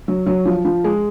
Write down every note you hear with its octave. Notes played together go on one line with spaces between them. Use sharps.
F#3
F#3
F3
F3
G#3